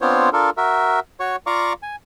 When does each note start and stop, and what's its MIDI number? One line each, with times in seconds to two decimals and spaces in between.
0.01 0.30 59
0.01 0.30 60
0.01 0.30 62
0.01 0.30 65
0.01 0.30 72
0.01 0.30 73
0.33 0.50 62
0.33 0.50 65
0.33 0.50 69
0.33 0.50 70
0.57 1.00 66
0.57 1.00 70
0.57 1.00 76
1.20 1.36 66
1.20 1.36 73
1.20 1.36 85
1.46 1.73 65
1.46 1.73 74
1.46 1.73 77
1.46 1.73 82
1.46 1.73 85
1.46 1.73 86
1.83 1.96 80